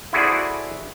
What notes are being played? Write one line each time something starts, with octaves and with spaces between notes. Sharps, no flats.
E4 F#4 G#4 A4 C5 D5